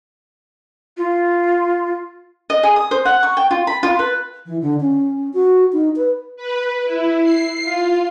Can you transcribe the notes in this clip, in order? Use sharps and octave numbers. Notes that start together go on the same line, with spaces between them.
F4
D#5
G#4
D#6
C5
F#5
C#6
G5
F4
B5
F4
B4
E3
D3
C#4
F#4
D#4
B4
B4
E4
C7
F4